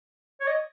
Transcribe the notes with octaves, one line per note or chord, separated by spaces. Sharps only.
C#5
D#5